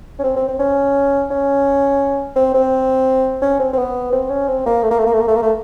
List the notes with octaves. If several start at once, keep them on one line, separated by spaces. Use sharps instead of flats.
C#4
C4
C4
C4
C#4
C#4
C4
C4
C#4
C4
C4
B3
C4
C#4
C4
A#3
A3
A#3
A3
A#3
A3
A#3
A3
A#3
A3